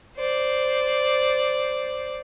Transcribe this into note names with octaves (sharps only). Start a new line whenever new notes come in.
C5 D5